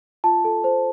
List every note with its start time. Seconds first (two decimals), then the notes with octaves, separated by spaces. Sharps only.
0.24 F4 A5
0.45 A4
0.64 C5